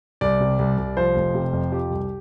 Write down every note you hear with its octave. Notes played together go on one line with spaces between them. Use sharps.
C2 D5
C3
C2
C2
F3 C5
F1
C3
F2
F3 G4
C2